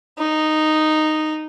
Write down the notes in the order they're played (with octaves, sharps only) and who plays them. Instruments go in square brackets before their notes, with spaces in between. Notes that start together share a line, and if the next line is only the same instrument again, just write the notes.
[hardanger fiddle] D#4